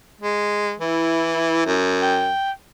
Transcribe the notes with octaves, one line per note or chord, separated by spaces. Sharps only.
G#3
E3 E4
F#2
G5